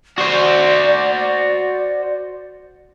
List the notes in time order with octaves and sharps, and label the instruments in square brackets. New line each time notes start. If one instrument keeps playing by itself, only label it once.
[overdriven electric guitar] F#4 C5 [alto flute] D5